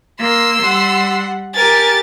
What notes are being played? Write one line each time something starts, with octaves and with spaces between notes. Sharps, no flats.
A#3 C6 E6
G3 F#5
G4 A#4 G#5 A6